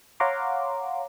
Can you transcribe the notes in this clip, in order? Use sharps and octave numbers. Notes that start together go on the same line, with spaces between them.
C#5 F5 F#5 A#5 C6 D6